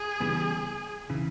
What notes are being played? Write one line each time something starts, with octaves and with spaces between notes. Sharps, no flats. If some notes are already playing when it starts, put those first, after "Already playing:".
Already playing: G#4
C#3 E3 G3 B3
C#3 E3